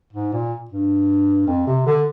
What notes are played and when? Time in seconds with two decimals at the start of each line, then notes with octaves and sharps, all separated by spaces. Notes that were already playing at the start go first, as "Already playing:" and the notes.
0.13 G#2
0.32 A#2
0.70 G2
1.47 F2
1.67 C3
1.86 D3